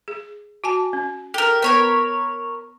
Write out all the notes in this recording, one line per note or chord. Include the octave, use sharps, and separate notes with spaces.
G#4
F#4 G#5 A5
C#4
G4 A4 A#4
B3 A#4 B4 C#5 B5